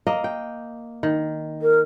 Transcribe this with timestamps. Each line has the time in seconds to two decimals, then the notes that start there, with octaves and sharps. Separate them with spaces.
0.07 A#3 D#5
0.24 G5
1.03 D#3
1.62 A#4